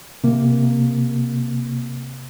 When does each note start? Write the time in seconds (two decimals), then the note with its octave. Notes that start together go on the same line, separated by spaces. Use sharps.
0.24 C3 A#3